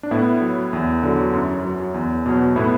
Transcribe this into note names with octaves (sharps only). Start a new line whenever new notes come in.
D4
A2 B3 E4
F#3
E2
D3 F#3
F#2
F#3
E2
B2 F#3
A2 B3 E4